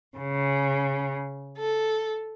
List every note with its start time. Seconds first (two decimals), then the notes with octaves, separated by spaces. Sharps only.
0.17 C#3
1.57 A4